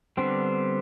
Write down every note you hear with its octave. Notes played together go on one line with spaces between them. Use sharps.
D3 G3 B3 C4 D4